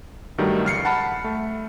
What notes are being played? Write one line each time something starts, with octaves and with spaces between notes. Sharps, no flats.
G2 D#3 F#3 G3 A3
C#2 F6 C7 C#7
F#5 A5 B5
A3